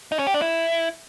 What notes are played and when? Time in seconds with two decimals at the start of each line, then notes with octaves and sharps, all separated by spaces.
0.12 D#4
0.19 C#4
0.27 G4
0.34 D4
0.42 E4